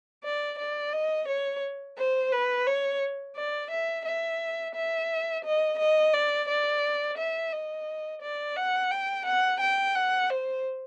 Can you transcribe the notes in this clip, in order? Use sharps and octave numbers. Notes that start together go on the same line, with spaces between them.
D5
D5
D#5
C#5
C5
B4
C#5
D5
E5
E5
E5
D#5
D#5
D5
D5
E5
D#5
D5
F#5
G5
F#5
G5
F#5
C5